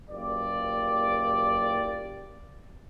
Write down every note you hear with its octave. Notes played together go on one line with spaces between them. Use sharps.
F#1 A#3 F4 G4 D5